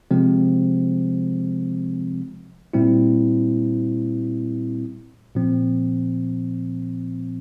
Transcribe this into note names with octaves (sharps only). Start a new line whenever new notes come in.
C3 F3 G#3 C4
A#2 G3 C4 E4
A#2 F3 C4